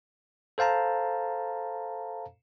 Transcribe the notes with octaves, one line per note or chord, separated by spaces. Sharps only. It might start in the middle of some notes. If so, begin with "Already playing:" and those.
A4 C5 F5 A5 A#5